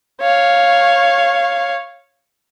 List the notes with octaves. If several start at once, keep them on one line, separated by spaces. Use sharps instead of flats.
C#5 F5